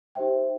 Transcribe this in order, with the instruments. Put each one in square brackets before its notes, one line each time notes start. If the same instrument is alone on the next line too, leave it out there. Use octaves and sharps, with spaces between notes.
[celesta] D#4 G4 C5 E5 G5